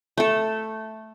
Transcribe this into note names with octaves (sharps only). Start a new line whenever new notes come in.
A3 A4